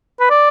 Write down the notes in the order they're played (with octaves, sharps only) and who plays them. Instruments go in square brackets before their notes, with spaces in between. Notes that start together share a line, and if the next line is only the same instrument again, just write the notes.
[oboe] B4
D5